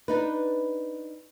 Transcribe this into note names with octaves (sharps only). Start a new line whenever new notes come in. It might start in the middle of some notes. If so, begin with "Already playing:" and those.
D4 D#4 B4